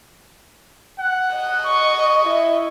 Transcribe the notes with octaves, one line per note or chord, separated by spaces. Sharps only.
F#5
D#5
C#6
E4